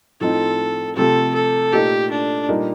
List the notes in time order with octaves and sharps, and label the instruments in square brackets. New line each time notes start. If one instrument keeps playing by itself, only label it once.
[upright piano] A2 F3 C4 D#4 [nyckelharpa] A4
[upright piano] C3 F3 A3 C4 [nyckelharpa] A4
[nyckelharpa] A4
[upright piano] A#2 A3 D#4 [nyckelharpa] G4
[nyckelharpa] D4
[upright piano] A#2 G3 A#3 D#4